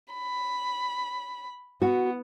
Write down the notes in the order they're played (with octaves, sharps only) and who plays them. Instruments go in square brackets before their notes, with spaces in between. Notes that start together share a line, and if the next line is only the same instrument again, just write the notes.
[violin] B5
[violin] B3 [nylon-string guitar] F#4